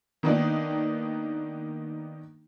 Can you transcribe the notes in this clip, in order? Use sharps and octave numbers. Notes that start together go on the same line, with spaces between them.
D#3 A#3 B3 D4 D#4